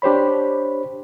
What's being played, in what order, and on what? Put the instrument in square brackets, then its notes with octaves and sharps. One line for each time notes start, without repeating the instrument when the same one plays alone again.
[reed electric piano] D4 G4 C5 C#5 B5